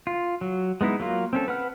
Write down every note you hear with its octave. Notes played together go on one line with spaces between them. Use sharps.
F4
F#3
G#3 B3 D#4 E4
F#3 A#3 F4
C4 C#4 A4
B4 F#5 F6